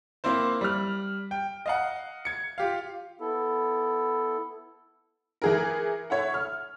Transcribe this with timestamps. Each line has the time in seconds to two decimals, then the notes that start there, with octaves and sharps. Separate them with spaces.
0.24 A#3 C4 E4 C5
0.61 G3 F6
1.31 G5
1.66 D#5 F5 F#5
2.25 G#6 C#7
2.58 F4 G4 F5
3.21 B3 E4 A4
5.42 E3 G#4 A#4
6.10 C#5 E5 F#5
6.34 F6